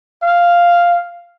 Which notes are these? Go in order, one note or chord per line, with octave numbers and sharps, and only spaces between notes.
F5